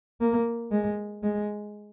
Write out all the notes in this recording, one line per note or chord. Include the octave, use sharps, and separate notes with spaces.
A#3
G#3
G#3